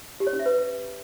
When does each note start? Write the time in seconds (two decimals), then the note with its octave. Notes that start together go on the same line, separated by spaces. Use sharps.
0.20 G4
0.27 C#5
0.33 C#4
0.39 E5
0.46 B4